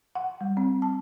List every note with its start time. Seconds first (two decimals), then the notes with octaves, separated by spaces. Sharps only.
0.15 F#5
0.41 G3
0.57 C4
0.82 A5